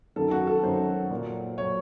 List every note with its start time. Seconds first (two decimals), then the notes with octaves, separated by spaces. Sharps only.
0.16 F#2 D#3 F#3 A4
0.31 F#4
0.47 A4
0.63 F#2 D#3 F#3 C5
1.11 A#2 F#3
1.58 A#2 F#3 C#5